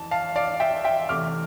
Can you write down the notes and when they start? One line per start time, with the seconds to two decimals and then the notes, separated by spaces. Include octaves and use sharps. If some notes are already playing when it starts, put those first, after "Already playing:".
Already playing: F2 E3 A5
0.11 F5 A5
0.36 D5 F5
0.60 E5 G5
0.84 E5 G5
1.09 E2 C3 E3 A3 D6 F6